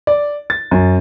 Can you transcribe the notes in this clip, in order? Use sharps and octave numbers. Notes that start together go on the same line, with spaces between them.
D5
A6
F#2